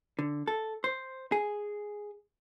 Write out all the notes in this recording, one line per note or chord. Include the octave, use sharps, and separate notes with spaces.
D3
A4
C5
G#4